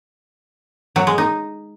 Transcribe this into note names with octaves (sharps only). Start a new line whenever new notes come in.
F#3
G#3
D#4